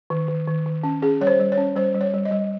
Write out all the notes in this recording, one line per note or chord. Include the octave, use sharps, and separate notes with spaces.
D#3
D#3
D#3
D#3
C#4
C#4 G#4
G3 C#5
C5
G3
C#5
C#4
G3 C5
G3
C#5
G3
D#5
G3